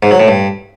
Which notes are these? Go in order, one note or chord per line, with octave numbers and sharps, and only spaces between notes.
G#2
F#3
A2
G2